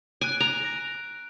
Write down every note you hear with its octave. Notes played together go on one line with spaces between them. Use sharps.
G#5 F#6 D7
A#5
A#6